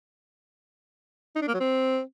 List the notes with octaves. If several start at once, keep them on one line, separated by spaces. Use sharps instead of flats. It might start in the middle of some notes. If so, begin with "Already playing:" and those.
D#4
D4
A#3
F#3
C4